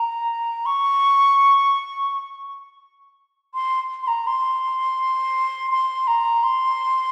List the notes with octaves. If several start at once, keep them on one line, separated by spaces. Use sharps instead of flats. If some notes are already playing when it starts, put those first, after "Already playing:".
Already playing: A#5
C#6
C6
C6
A#5
C6
C6
A#5
C6